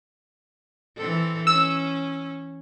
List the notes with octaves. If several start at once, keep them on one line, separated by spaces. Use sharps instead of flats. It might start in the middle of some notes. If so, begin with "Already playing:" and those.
E3 C4 A4
C#4 E6